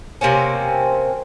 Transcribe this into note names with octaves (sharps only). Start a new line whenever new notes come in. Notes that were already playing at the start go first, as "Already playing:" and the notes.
C3 A#3 C4 C#4